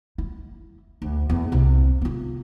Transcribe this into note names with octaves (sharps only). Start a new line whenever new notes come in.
E4
D2
E2
C2 C3
B3 F4